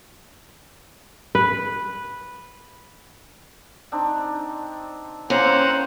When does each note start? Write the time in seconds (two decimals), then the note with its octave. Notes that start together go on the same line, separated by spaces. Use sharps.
1.35 B4
3.92 C4 D4 D#4
5.30 E3 A#3 C4 C#4 C5 F#5 A#5